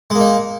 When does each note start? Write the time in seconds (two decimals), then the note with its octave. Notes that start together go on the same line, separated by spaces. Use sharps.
0.10 G#3
0.15 A#3
0.20 D#4